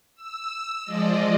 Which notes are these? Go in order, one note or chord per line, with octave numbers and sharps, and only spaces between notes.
E6
F3 G#3 D5 D#5